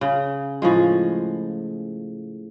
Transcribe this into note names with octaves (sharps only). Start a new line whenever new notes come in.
C#3
A2 F3 G#3